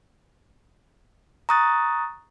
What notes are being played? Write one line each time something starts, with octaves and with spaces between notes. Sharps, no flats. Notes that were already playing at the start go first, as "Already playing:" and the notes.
A#5 C#6 D#6 F#6 A6